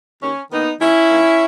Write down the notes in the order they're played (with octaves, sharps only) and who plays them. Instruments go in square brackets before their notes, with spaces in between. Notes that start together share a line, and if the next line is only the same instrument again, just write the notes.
[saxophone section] D#2 C#4
D#3 A#3 B3 D#4
D#2 C#4 E4
D#3 A#3